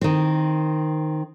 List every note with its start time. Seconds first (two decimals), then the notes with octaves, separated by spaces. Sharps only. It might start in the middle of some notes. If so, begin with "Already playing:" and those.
0.01 D#3 C4